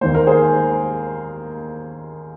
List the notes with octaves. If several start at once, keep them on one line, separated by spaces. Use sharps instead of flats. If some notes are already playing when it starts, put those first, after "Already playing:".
D#2 D#3 A#3 C5
A#4
G#4 C5